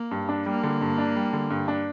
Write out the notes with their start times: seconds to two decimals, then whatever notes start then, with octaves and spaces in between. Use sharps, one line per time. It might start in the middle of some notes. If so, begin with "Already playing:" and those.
Already playing: A#3
0.11 G2
0.29 D4
0.46 G3 A#3
0.63 D3
0.81 G2
0.98 D4
1.16 G3
1.33 D3
1.50 G2
1.68 D4